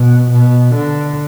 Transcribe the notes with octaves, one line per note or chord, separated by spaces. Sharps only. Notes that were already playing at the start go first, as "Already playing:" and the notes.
Already playing: B2
B2
D3